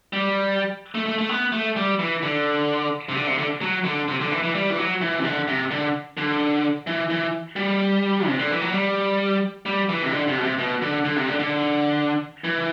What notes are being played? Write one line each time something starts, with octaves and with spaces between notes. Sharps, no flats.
G3
A3
A3
A3
B3
A3
G3
E3
D3
C3
D3
C3
D3
F#3
D3
C3
D3
E3
E3
G3
E3
F#3
E3
C3
D3
C3
D3
D3
E3
E3
G3
C3
D3
E3
F#3
G3
G3
E3
C3
D3
C3
B2
C3
B2
D3
D3
C3
D3
D3
E3